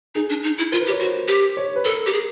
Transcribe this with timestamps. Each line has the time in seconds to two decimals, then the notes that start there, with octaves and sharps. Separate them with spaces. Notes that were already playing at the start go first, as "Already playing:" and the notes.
0.15 D#4 G#4
0.29 D4
0.43 D#4
0.58 E4
0.72 F4 A#4
0.81 B4
0.86 G4
0.90 C#5
1.00 F#4 C5
1.28 G4
1.57 C#5
1.76 B4
1.85 A4 A#4
2.06 G4
2.13 G#4